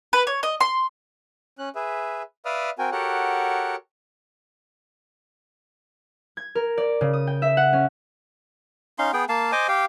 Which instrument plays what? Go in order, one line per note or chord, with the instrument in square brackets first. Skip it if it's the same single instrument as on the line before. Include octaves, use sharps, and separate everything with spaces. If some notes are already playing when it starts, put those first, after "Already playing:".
[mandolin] B4
C#5
D#5
C6
[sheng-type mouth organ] C#4 F#6
G#4 B4 E5
B4 D5 E5 F5 D#6 F6
C4 F#4 A#4 G5 G#5
F#4 G4 A4 A#4 C#5 F#5
[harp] G#6
A#4
D5
C#3
D#6
G5
E5
F#5
C#4
[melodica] C#4 D#4 F5 C6
B3 G#4 G5
A#3 F5 A5
C5 D#5 G#5 D6
G4 F5 G5